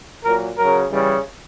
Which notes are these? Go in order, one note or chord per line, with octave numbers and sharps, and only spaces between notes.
A#2 F#3 A#4
C#3 F#3 A#4
C#3 E3 G3